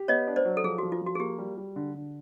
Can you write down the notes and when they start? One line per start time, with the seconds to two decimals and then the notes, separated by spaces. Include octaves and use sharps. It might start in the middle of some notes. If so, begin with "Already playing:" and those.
Already playing: G4
0.08 B3 C#5 D#5
0.27 D4
0.36 C5 D5
0.45 F#3
0.57 A4
0.64 F3 G#4
0.78 F3 F#4
0.92 F4
1.02 F3
1.07 F#4
1.15 G#4
1.20 A#3 G4
1.39 G3
1.58 G3
1.76 D3
1.94 D3